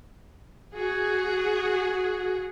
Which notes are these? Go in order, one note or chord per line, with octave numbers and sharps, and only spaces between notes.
F#4 G#4